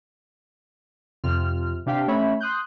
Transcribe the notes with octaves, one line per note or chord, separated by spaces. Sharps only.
F2 C3 C4 F4 F6
C3 D4 G4 F5 G5 B6
A3 C#4 C#5 E5 B5
C6 D#6 F#6 G6